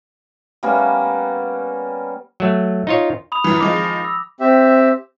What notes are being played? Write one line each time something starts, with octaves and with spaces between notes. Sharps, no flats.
G3 A#3 B3 C#4
F#3 A3
D#4 F4 C#5
B5 D#6 F7
F#2 E3
D#3 F3 G#3 D6
A#6
E6
C4 G4 E5